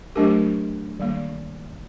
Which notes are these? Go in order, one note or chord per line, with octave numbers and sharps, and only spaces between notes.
F#3 A3 D4 G4 A#4
D#3 G3 A#3